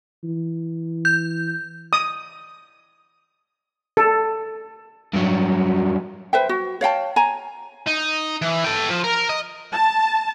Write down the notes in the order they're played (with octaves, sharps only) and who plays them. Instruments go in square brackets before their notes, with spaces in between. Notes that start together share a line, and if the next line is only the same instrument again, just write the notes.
[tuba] E3
[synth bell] G6
[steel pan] D#6
A4
[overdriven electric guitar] G2 F#3
[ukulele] B4 C5 E5 G5
F#4
C#5 F5 G5 A5
G#5 A#5
[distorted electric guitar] D#4
E3
A4 G5
F3
A#4
D#5
[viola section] A5